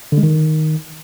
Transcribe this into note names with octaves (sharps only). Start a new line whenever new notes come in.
D3
G#3
D#3